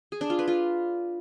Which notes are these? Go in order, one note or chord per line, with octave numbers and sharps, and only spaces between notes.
G#4
D4
F4
B4
F4